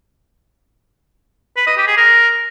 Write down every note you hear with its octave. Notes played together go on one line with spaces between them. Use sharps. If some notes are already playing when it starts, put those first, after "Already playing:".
B4
D#5
G4
G#4
A#4